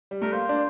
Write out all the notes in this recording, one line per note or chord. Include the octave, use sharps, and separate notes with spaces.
G3
A3 A#4
A#3 C5
D4